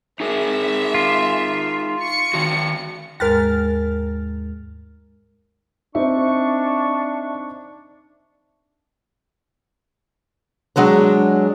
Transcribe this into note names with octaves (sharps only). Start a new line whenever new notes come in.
D#4 G#4 A#4 E5
F4
C#6 C#7
D#3 F#4
D#2 G#2 G#3 A#4 F6 A6
C4 D4 D#4 C5 E5 C#6
F#3 G#3 D4 C#5